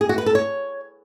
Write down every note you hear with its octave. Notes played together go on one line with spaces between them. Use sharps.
G#4
F#4
B4
A4
C#5